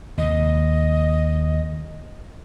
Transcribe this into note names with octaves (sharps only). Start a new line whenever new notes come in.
D#2 C3 D#5